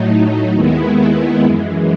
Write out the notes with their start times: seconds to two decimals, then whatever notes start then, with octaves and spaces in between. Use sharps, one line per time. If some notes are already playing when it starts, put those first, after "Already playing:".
Already playing: A2 F#3 A3 D#4
0.52 D#2 D#3 G#3 B3 E4
1.42 F#2 E3 G#3